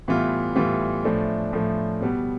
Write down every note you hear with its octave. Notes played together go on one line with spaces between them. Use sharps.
A2 E3 G3 B3 F4
A2 E3 G3 B3 F4
A2 F3 A3 D4
A2 F3 A3 D4
B2 G3 B3